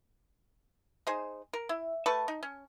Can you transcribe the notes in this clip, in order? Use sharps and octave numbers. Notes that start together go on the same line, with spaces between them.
D#4 G#4 C5
A#4
E4
A3 B4 A5 C#6
D#4
C#4